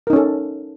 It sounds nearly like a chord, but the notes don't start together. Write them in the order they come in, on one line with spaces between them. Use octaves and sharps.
A#4 D#4 C#4 A4